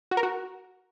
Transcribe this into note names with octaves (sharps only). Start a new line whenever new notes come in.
F#4
A#4
F#4